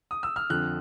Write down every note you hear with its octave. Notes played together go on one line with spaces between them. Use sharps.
D#6
E6
F6
F2 D3 F3 F#6